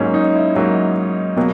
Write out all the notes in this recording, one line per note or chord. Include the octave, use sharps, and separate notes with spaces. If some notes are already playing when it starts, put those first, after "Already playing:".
Already playing: G#2 F#3 A#3 C#4
D#4
E4
G#2 F#3 A#3
B2 F#3 A#3